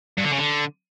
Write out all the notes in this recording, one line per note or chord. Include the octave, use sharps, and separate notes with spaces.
G2
D3
C#3
D3